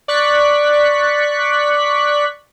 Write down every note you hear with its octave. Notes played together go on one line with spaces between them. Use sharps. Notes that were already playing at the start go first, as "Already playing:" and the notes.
D5 C#6 F#6 B6